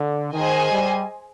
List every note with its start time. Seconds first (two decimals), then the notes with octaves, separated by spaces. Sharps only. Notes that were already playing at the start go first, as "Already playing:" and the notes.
Already playing: D3
0.33 D#3 G#4 C5 D#5 G#5
0.70 G3